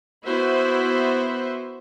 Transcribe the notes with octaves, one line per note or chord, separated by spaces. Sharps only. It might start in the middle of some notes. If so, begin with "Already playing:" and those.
B3 E4 F#4 C5 E5